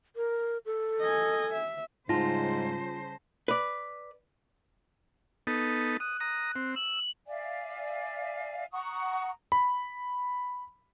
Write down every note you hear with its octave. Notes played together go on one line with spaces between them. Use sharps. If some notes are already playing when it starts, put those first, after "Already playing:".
A#4
A4
D#5 G#5
E5
G#2 C#3 G3 F4 C5 A5 A#6
B4 D5
B3 D#4 A4
D#6 F#6
A#5 D#6
C4
E6 F#7
D5 E5 F5 G#5
F#5 A#5 C#6 D#6
B5